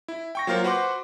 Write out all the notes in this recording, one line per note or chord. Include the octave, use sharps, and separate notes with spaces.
E4
G5 C#6 A#6
F#3 A#3 F4 A#4 C5
F#4 B4 C5 F#5 C6 D6